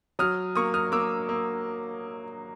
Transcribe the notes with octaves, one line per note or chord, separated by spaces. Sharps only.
F#3 D#6 F6
A#3 C#6 D#6
D#6 F6
A#3 D6 E6
A#3